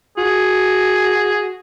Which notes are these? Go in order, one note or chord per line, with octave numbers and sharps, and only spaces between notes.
F#4 G#4